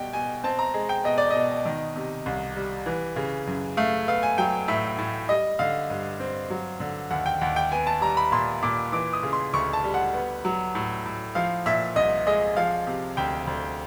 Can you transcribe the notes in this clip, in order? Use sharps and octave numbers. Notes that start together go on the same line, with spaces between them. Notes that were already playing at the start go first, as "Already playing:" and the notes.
Already playing: B2 G3 G5
B2 G#5
C4 A5
A#5
G#3
G5
B2 D#5
D5
B2 D#5
D#3
C3
C2
G3
E3
C#3
F#2
A3 F5
B3 F5
G#5
F#3 G5
A2 E5
A2
G3 D#5
D3 F5
G2
C4
F#3
D3
D#2 F#5
G5
D#2 F#5
G5
B3 G#5
A5
G3 A#5
B5
A#2 C6
A#2 D6
E3 D6
D#6
C#3
C6
D2 C#6
A5
G3
F#5
B3
F#3
A2
A2
F3 F5
A#2 E5
C2 D#5
G#3 D#5
F3 F5
C3
D2 G5
D2